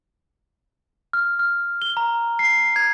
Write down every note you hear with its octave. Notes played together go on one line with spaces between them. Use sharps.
F6
F6
G7
A#5
C7
G#6